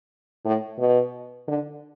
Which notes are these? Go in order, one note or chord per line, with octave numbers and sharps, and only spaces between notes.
A2
B2
D3